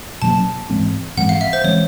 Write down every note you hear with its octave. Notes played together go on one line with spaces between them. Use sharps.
B2 F#3 A#3 C#4 A5
G#2 E3 G#3 C4
G#2 E3 G#3 C4 F#5
F5
E5
C5
E3 G#3 C4 C#5